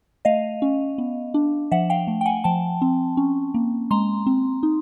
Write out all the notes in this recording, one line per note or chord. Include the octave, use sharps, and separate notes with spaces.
A3 D#5 F5
C#4
B3
D4
F3 E5 F#5
F5 G5
A3
G5
F#5 G#5
F3 G5 A5
C4
C#4
A#3
G#3 A#5 C6
C4
D#4